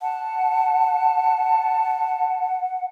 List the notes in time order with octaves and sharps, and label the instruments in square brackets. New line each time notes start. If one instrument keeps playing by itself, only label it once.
[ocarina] F#5 [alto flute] A5